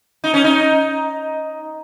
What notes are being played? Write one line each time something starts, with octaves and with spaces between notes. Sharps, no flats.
D#4
C#4
D#4